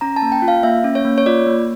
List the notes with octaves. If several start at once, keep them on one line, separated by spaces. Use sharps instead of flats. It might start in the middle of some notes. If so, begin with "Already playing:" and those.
C#4 A#5
A5
A#3
G5
F4
F5
A#3 E5
C#4
C#5
A#3
C#5
F4 D5
A#3